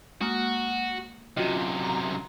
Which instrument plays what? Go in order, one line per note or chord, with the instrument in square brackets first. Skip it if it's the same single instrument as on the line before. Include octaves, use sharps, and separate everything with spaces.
[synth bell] G#3 A#3 [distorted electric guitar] F#4
[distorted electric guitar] F#2 C3 [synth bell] F4 F#4 D#5
[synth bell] A#5